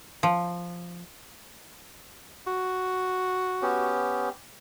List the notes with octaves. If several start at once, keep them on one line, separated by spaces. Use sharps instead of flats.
F3
F#4
B3 C#4 G4